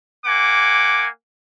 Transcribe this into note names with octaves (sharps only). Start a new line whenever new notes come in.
A#3 F#5 G#5 D6